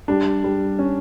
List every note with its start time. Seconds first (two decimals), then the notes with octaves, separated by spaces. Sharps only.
0.08 G3 D4
0.44 G3
0.79 C#4